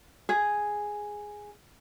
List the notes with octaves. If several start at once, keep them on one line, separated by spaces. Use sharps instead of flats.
G#4